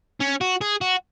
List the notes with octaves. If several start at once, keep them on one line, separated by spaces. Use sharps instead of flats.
C#4
F#4
G#4
F#4